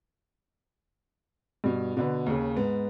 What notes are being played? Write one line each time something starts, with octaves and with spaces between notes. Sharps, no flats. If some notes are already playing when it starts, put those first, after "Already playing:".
G2 B2
B2 D3 B4
D#2 C#3
G#2 B3